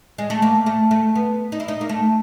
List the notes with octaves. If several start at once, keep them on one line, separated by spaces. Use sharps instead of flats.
G#3
A3
A#3
A3
A3
B3
D#4
E4
D#4
A#3
A3